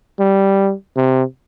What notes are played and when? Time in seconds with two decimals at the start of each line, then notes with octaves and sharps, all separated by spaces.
0.20 G3
0.96 C3